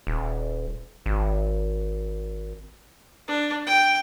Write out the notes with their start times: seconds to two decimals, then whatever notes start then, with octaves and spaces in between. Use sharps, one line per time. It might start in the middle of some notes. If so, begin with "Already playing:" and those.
0.07 D#1
1.06 G#1
3.28 D4
3.67 G5